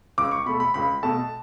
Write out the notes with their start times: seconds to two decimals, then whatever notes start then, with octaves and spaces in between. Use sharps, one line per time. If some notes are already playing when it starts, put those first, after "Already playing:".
0.18 C#2 D6
0.31 C#6
0.46 B2 A3 B5
0.60 B5
0.74 C#2 B5
1.03 B2 A3 A5